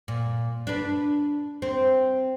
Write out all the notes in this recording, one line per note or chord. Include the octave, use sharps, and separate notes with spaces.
A#2
D4 B4
C4